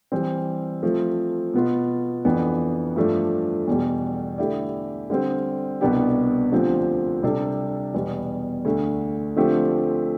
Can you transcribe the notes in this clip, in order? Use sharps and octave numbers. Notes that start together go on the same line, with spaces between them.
E3 G3 C4
F3 A3 C4
B2 B3 F4
F2 E3 B3 D4
G2 F3 A3 D4
E2 B2 G3
D3 A3 E4 G4 D5
D3 G3 C4
C2 B2 B3 D4 G4
D2 D3 F3 C4 G4
C3 G3 D4 A4
E2 B2 G3 B3
D2 D3 A3
D3 F3 A3 C4 G4